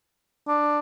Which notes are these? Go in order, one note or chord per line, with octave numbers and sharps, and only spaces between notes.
D4